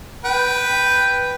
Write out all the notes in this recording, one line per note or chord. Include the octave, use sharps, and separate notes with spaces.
B4 G5